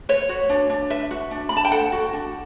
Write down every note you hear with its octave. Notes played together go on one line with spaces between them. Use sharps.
B4 C#5
F#4
D4
D4
B4 E5
F#4
D4
D4 B5
A5
G5
A4 F#5
F#4
D4